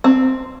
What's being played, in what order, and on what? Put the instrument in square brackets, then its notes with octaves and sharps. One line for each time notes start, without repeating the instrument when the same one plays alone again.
[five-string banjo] C4